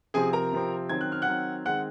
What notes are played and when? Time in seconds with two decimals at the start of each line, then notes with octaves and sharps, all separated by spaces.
0.14 C3 F3 C4 G#4 G#5
0.33 A#4 A#5
0.52 C3 F3 C4
0.89 D#3 F#3 C4 G#6
1.01 F#6
1.12 F6
1.22 F#5 F#6
1.28 D#3 F#3 C4
1.66 D#3 G#3 C4 F#5 F#6